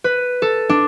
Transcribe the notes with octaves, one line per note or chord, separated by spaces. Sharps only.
B4
A4
D4